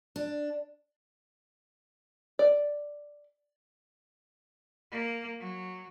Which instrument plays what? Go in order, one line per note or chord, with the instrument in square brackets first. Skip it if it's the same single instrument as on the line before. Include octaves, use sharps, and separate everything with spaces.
[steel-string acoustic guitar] D4
[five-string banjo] D5
[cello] A#3
F#3